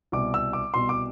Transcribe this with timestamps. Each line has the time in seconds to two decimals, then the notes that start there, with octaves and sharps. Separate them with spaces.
0.12 C2 B2 D6
0.34 E6
0.53 D6
0.74 C2 B2 C6
0.89 D6